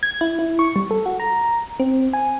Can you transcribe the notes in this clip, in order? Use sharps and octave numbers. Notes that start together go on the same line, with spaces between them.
G#6
E4
E4
C#6
G3
A4
F#4
A#5
C4
G#5